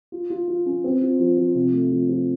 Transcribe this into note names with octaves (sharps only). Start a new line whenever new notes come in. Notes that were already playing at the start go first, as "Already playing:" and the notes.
F4
F4
F4
C#4
C4
F4
F3
F3
C3
A3
F3
F3